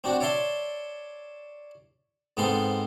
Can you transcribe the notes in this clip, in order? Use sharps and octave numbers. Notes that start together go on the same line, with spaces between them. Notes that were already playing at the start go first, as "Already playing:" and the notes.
C4 D4 F#4
C#5 D5 E5 A5 C6
G#2 G#3 B3 C4 A4 C6